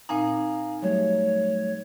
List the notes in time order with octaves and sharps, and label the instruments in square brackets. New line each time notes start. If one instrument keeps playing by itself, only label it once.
[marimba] A#2 C4 D#4 [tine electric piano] F5 G#5 A#5
[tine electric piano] F#3 G3 A3 [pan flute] C#5